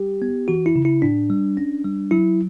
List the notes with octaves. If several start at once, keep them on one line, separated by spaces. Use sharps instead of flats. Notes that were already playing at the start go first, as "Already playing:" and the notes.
Already playing: G3 G4
B3
E3 F#4
E4
C#3
E4
A2 D4
G3
C#4
G3
F#3 E4